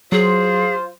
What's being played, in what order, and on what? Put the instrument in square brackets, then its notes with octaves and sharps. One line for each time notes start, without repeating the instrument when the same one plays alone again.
[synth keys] F#3 [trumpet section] F4 C5 [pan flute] G#4